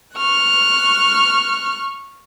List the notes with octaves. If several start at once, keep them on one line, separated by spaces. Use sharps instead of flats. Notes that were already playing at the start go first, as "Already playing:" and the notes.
C#6 F6 F#6